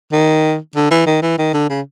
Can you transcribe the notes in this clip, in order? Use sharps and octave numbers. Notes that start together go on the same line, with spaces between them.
D#3
D3
E3
D#3
E3
D#3
D3
C#3